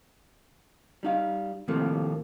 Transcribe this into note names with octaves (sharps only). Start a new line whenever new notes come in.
G3 D#4 F5
D#2 A2 C3 F3 A3 A#3